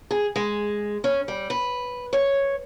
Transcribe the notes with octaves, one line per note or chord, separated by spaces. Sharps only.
G#4
G#3
C#4
G3
B4
C#5